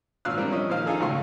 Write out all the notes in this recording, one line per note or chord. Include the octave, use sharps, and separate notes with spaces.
G#1 A#2 F5 E6 F#6
E3 G3 C4 D4 A#4
F3 C#4 D#5 E5
A#2 D#3 F3 C5 F5
D#4 F4 G#4 A4
G#1 C#2 A#2 C#3 A3 C6